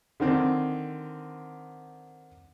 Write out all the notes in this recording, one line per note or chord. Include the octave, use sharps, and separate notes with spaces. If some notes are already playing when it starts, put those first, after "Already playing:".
D3 D#3 C4